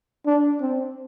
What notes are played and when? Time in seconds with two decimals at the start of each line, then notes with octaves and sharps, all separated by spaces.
0.27 D4
0.61 C4